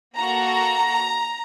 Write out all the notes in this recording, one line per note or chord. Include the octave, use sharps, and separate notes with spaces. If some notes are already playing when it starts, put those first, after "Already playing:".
A#3 F#4 A4 A#5